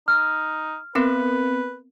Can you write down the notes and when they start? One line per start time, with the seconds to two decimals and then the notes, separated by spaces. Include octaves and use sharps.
0.08 D#4 F6
0.95 B3 C4 A#4 B4